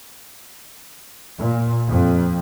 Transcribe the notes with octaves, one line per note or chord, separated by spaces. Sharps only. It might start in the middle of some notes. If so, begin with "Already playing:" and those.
A#2
F2